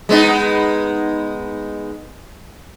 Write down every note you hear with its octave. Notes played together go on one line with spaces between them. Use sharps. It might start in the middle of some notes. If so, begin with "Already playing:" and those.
G#3 B3 D#4